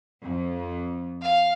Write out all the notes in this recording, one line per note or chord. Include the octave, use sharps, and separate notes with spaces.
F2
F5